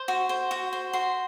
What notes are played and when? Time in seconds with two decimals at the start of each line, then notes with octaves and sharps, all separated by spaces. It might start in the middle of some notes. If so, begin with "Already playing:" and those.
Already playing: C5
0.08 F#4
0.29 C5
0.51 F#4
0.73 C5
0.93 F#4 C6